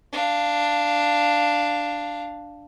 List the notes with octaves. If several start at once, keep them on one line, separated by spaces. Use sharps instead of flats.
D4 F5